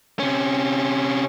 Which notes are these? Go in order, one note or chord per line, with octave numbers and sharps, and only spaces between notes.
C3 C#4